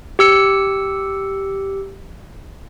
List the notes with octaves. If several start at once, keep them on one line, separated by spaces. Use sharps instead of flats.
G4 E6 C#7